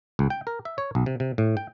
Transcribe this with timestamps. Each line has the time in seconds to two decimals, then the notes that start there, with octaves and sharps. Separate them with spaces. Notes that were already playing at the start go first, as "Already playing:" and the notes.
0.19 C#2
0.30 G5
0.47 A#4
0.65 E5
0.78 C#5
0.95 B1
1.06 C3
1.20 C3
1.38 A2
1.57 G5